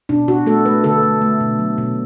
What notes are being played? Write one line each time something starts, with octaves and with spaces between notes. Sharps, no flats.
B2 D4
B2 F#4
A3 A4
A3 B4
D3 A4
A3
A3
B2
F#3
B2